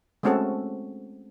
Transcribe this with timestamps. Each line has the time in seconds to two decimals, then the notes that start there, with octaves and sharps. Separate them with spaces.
0.23 G#3 A3 C4 C#4 F#4 A4